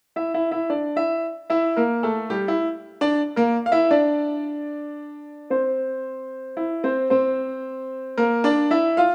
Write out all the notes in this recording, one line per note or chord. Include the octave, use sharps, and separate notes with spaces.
E4 E5
E4 E5
E4 E5
D4 D5
E4 E5
E4 E5
A#3 A#4
A3 A4
G3 G4
E4
D4 D5
A#3 A#4
F5
E4 E5
D4 D5
C4 C5
E4
C4 C5
C4 C5
A#3 A#4
D4 D5
E4 E5
F4 F5